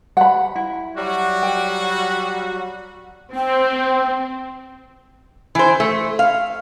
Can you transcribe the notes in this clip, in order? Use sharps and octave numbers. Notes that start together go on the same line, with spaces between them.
F#5 B5
E4
F#3 G3 F#4
G5
C4 G5
E3 C5
A3
F5